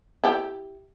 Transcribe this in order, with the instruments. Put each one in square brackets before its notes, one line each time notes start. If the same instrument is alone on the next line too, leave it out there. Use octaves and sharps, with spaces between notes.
[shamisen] E4 G4